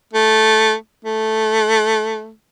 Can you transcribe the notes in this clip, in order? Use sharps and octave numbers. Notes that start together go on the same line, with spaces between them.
A3
A3